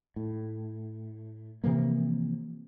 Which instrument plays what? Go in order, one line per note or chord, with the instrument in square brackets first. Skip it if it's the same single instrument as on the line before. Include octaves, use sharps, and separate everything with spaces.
[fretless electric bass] A2
C3 E3 F3 A#3